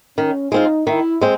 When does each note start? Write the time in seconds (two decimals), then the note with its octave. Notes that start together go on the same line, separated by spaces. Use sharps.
0.17 D#3 C#4
0.52 G#3 C4 D#4 F4
0.87 D#3 E4
1.21 G#3 C4